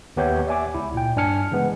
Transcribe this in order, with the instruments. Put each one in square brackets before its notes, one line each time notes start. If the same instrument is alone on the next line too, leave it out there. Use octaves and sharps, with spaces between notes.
[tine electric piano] D#2 B3 G4 C#5 E5 G6
D5 E5 G#5 D6
C#2 E4
A#2 G5
G2 D4 G#5 F6 C#7
C#3 E3 G#3 B3